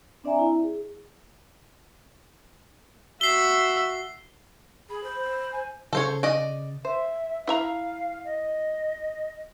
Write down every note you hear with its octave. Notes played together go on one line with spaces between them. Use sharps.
C4 D4 D5 E5 G#5 A#5
E4
G#4
F#4 E5 C7 G7
G#4 B5
C5
G#5
C#3 A4 C5 C#5
D5 D#5
C5 E5
E4 E5 F5 A#5
D#5